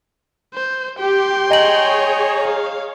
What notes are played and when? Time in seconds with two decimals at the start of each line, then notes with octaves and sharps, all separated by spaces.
0.55 C5
0.99 G4 G5 C6
1.51 G#4 C#5 D#5 G#5 A#5 F#7
2.42 F5